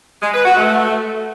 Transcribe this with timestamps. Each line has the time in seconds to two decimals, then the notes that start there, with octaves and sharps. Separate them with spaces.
0.22 G#3
0.34 B4
0.45 F#4
0.57 A3